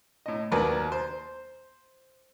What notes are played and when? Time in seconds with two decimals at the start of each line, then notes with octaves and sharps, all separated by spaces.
0.26 A2 D#5
0.52 D#2 D4 F#4 A#4 B4 B5
0.92 C5